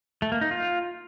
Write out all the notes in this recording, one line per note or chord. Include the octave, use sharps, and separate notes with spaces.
A3
A#3
D#4
F4